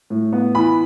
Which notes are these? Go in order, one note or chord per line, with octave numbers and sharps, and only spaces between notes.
A2
B3
E3 B5